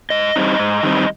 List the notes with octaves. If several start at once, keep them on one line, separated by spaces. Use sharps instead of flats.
G#2 D#5
G3 C4 D#4
G#2
D#3 G3 C4 D#4